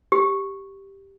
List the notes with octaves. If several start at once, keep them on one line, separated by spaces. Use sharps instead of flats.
G4